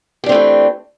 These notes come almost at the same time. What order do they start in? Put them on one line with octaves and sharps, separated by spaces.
G4 D4 C4 A3 E3